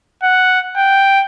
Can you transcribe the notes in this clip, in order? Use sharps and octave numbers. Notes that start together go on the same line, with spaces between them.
F#5
G5